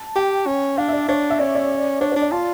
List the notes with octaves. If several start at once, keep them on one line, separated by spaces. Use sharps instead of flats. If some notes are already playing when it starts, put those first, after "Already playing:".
Already playing: A5
G4 G5
C#4
D4 F5
E5
D5
D4 C#5
E5
C#4 D5
D5
D4 C#5
D4 C#5
D5
F4 A5